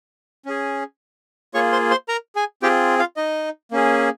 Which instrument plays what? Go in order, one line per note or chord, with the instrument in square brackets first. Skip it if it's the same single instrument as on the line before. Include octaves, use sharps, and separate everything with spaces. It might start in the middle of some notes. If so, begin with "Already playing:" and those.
[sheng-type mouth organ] C#4 G#4
A#3 F4 G#4 C#5 C#6
C5 C6
C5 C6
A#4 A#5
G#4 G#5
C4 F4 G4 G#4 G5
F4 F5
D#4 D#5
A#3 C#4 G#4